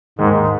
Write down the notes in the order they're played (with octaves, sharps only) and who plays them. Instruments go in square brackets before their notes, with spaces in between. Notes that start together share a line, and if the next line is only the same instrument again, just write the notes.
[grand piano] D#2 D#3 G#3 [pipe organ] G#2